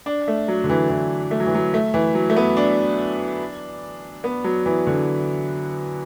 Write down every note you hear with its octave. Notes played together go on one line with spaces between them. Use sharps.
D4
A3
F#3
D3
E3
E3
A3
F#3
E3
F#3
A3
E3
F#3
A3
B3
D4
B3
F#3
E3
D3